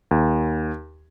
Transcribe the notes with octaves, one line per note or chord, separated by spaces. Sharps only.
D#2